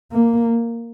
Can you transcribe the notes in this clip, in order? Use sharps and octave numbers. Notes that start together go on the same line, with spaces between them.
A#3